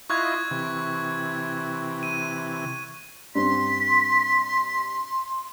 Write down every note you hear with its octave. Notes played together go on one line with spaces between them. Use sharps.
E4 F4 D#5 C#6 F#6 G#6
C3 E3
D#7
G2 C4 C6 B6